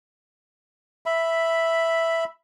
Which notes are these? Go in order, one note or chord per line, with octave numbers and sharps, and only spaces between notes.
E5 B5